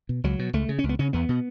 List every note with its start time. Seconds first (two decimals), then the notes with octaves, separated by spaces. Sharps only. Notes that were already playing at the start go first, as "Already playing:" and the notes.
0.09 B2
0.24 C#2 F#3
0.39 B2
0.53 C#2 A3
0.69 C#3
0.79 C#4
0.84 C#2
0.89 B3
0.99 C#3 C#4
1.13 E2 B3
1.29 B2